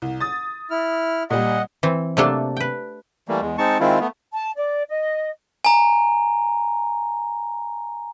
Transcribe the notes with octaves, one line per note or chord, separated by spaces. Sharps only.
C2
D#6 A6
E4 F6
A#2 G3 D#5 F#5
E3 C4
C3 F#3 A3 A#3 D4 A4
B4 G5
E3 G3 A3 A#3
E2 G#3
G#3 C4 D#4 A5 C#6
D#3 G#3 C4 E4 F4
A3 B3
A5
D5
D#5
G#5 A#5